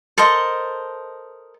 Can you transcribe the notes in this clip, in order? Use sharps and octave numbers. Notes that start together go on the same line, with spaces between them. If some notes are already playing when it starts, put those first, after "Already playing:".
A4 A#4 C5 D#5